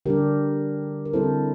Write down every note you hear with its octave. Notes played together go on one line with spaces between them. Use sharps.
D3 G3 D4 G4 A#4
A#4
D3 G3 C4 E4 A4 C5